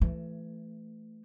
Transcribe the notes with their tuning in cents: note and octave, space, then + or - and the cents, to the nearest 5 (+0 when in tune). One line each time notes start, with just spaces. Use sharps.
E3 +25 A3 +0